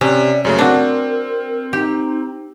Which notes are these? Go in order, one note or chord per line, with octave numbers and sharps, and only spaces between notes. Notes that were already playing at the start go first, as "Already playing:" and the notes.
C3 C#4 D5
F#2 C#3 A3 C#5
C4 D4 F#4 A#4
D#4 G4